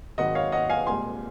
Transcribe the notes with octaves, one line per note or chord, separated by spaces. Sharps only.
G#1 G#2 D#3 F#3 D#5 F#5
C#5 F5
D#5 F#5
F5 G#5
C2 A#2 G#3 G#5 C6